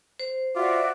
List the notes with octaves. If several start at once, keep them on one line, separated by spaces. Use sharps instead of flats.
C5
F4 F#4 D5 E5 D6